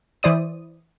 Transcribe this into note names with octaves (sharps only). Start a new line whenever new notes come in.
E3 E4 C5 D5 D#6 D#7